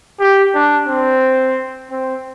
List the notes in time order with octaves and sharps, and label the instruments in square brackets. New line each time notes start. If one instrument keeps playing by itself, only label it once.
[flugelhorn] G4
D4
C4
C4